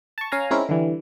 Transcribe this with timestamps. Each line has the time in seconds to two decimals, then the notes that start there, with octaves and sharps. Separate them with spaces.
0.18 A5 C#6
0.32 C#4 F5 G#5 A#5
0.51 G#3 C4 C#4 D#4 E4 A#4
0.69 D3 E3 G3